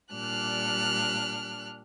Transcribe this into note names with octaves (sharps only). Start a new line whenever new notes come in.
A#2 G3 D4 F6 F#6